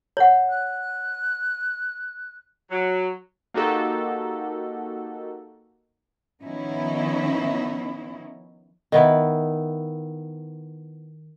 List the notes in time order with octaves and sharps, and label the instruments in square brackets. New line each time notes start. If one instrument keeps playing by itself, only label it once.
[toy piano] C#5 F#5
[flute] F#6
[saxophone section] F#3
[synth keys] A#3 D#4 F#4 G4 A4
[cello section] D#3 F3 B3 C#4 D#4 E4
[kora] D#3 B3 E4